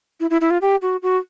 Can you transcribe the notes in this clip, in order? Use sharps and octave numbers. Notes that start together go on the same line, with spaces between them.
E4
E4
E4
F4
G4
F#4
F#4